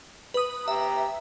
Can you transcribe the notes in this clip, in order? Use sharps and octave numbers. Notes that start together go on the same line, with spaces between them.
B4 D#6
G4 E5 A#5